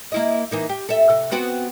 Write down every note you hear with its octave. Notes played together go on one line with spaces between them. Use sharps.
A#3 E4 D#5
E3 A#3 D#4
G4
A4 E5
C3 A4
B3 C4 F#4